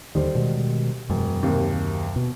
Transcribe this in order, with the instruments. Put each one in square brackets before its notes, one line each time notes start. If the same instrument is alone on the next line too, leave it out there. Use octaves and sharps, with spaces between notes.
[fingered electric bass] D#2 D3 D#3 [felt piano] G3 C5
[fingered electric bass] B2 D#3 G#3
[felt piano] E1 [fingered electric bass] F#2
[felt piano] D#2 C3 A#3
[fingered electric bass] B2